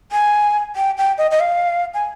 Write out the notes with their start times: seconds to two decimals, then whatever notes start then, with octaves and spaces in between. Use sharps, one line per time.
0.12 G#5
0.76 G5
0.97 G5
1.18 D#5
1.31 D#5
1.40 F5
1.94 G#5